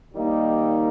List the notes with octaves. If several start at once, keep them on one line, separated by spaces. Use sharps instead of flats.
D#2 D#3 G3 A#3 D#4